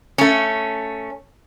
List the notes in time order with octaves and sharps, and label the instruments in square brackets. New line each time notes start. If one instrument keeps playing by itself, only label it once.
[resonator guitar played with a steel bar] A3 C#4